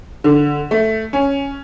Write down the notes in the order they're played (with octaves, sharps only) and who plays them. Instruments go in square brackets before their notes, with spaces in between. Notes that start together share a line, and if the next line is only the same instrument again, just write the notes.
[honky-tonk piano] D3
A3
C#4